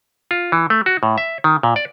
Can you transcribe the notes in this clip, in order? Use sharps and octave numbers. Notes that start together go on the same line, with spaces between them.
F4
E3
A3
F#4
A2
E5
D#3
A#2
D5